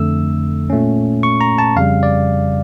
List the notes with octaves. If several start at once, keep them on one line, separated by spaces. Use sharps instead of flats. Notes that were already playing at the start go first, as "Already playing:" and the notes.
Already playing: F2 D3 A3 E6
A#2 A3 C#4
C#6
A#5
A5
F2 C#3 G3 F5
D5